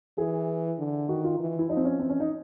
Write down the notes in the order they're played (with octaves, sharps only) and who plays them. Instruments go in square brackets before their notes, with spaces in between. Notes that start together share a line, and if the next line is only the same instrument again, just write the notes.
[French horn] E3 [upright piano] G#4
[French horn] D3
[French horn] D#3 [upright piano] F#4
[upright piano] F4
[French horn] E3
[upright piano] E4
[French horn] F3 [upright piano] D#4
[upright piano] C4
C#4
[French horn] E3 [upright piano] C4
[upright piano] C#4
D#4